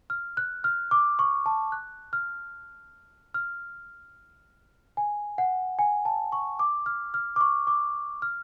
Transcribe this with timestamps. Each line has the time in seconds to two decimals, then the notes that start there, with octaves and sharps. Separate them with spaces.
0.10 F6
0.37 F#6
0.64 F6
0.91 D6
1.19 C#6
1.46 A5
1.72 F#6
2.13 F6
3.34 F6
4.97 G#5
5.38 F#5
5.79 G#5
6.05 A5
6.32 C#6
6.59 D6
6.86 F6
7.14 F6
7.36 D6
7.41 C#6
7.67 D6
8.22 F6